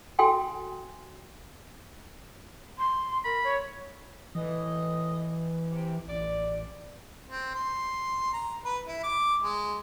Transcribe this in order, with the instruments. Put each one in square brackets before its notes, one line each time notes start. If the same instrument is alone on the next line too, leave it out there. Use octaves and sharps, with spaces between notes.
[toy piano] F#4 A4 F5 G5 G#5 C6
[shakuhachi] C6
[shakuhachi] A#4 [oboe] B5
[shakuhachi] C#5
[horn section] A2 D#5 [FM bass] E3
[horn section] C3
[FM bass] A1 [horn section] D5
[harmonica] C4
C6
A#5
B4
E4
D6
G#3